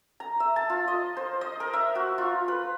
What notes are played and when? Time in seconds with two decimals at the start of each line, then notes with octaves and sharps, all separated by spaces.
0.20 A#5
0.40 E5
0.56 A5
0.70 F4
0.88 D#5
1.17 C5
1.41 D#5
1.60 A#4
1.73 E5
1.95 F#4
2.18 F4
2.48 B4